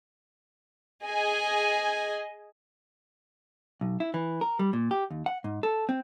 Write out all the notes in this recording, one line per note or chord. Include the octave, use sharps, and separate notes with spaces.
G#4 D#5 G#5
B1
E4
E3
A#4
G3
A#2
G4
D#2
F#5
G#2
A4
C4